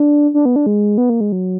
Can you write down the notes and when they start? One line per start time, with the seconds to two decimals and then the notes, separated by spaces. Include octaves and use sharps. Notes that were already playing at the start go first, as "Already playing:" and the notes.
Already playing: D4
0.34 D4
0.45 B3
0.56 D4
0.66 G#3
0.98 B3
1.10 A#3
1.21 G#3
1.32 F#3